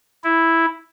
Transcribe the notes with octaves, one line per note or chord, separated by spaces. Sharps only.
E4